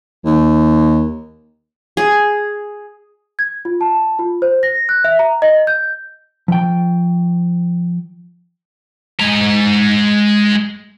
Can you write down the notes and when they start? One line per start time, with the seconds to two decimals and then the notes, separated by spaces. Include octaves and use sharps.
0.25 D#2
1.97 G#4
3.39 G#6
3.65 F4
3.81 A5
4.19 F4
4.42 C5
4.63 A#6
4.89 F#6
5.04 E5
5.19 A#5
5.42 D#5
5.67 G6
6.48 F3 G5
9.20 G#3 A#5